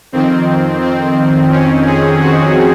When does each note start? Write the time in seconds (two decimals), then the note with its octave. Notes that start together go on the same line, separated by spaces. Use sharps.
0.12 F2 D#3 C4
0.82 C4
1.52 C#4
1.86 G#4
2.20 F#4